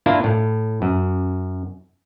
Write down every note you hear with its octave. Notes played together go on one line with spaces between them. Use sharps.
A#3 D4 E4 F4
A2
F#2